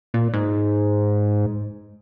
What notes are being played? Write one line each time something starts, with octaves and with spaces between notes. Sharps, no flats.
A#2
G#2